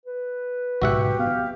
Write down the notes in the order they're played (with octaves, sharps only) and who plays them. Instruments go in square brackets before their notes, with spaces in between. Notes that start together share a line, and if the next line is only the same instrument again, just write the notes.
[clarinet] B4
[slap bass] B1 G#2 C#3 [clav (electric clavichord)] F#4 E5 F#5 [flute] G4
[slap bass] B3 [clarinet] F5